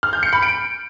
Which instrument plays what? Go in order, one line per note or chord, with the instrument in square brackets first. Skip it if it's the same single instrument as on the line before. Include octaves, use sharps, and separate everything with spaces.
[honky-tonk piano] F6
G6
C#7
B5
D7